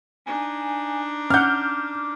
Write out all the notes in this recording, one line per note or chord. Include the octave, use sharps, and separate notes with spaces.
D4 D#4 G#5
C#4 F#5 D6 F6 G6